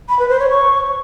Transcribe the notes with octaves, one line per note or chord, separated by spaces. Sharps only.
B5
B4
C5
C#5
C#6